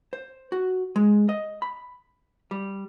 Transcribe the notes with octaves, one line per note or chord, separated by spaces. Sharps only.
C5
F#4
G#3
D#5
B5
G3